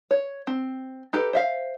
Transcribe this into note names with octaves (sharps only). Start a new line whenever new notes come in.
C#5
C4
D#4 G4 A4 B4
C5 E5 F5